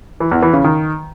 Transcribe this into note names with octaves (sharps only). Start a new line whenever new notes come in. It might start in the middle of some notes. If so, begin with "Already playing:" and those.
E3
E2
E3
C#3
D#3